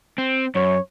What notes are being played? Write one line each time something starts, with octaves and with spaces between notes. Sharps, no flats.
C4
F#2 C#5